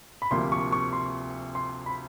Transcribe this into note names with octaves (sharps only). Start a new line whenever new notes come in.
B5
D2 C3 F3 A#3 C6
C#6
C#6
C6
C6
B5